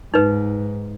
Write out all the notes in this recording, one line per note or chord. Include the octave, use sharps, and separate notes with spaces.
G#2 D#4 B4